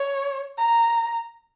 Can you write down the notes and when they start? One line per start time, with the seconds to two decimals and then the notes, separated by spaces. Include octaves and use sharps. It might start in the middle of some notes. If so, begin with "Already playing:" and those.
Already playing: C#5
0.58 A#5